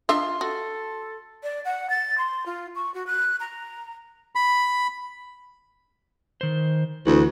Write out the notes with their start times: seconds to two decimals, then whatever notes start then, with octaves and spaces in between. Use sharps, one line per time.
0.09 D4 F4 D#5 E5 C6
0.41 F#4 A4
1.43 D5
1.65 F#5
1.90 A6
2.18 C6
2.46 F4
2.75 C#6
2.94 F#4
3.07 F#6
3.40 A#5
4.35 B5
6.41 D#3 C5
7.07 D2 E3 F#4